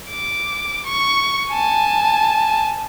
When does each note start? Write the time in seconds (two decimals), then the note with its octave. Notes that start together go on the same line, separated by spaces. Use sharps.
0.10 D6
0.86 C#6
1.49 G#5 A5